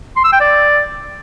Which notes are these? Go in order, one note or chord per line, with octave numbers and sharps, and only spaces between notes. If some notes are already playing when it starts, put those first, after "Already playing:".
C6
E6
G5
D5